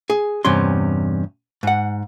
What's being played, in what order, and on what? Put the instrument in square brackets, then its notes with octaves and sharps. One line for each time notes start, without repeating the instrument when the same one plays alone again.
[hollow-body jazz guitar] G#4
E2 G2 C3 C#4 C6
G#2 F#5